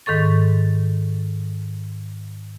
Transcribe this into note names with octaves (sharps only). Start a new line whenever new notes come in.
G#2 D#3 A4 C#6 A6